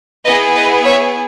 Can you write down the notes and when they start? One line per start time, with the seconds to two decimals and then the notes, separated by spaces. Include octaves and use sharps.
0.25 B3 E4 G#4 B4 D#5
0.55 B4 D#5
0.84 C#5 E5